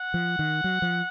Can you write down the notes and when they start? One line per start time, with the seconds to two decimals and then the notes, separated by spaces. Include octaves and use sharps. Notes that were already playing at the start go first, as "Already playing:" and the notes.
Already playing: F#5
0.14 F3
0.39 D#3
0.64 F#3
0.82 F3